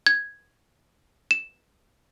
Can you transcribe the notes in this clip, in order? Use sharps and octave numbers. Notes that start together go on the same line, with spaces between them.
G#6
E7